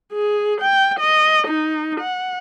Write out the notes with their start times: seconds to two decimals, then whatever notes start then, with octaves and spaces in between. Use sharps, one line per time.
0.13 G#4
0.61 G5
1.00 D#5
1.48 D#4
2.01 F#5